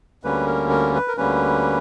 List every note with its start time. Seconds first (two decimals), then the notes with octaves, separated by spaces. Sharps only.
0.23 D2 D3 G3 A#3 C#4 B4
0.46 A#4
0.70 A#4
0.94 B4
1.08 A#4
1.17 D2 D3 G3 A#3 C#4 B4